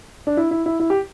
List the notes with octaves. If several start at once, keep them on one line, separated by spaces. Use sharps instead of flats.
D4
E4
E4
E4
E4
G4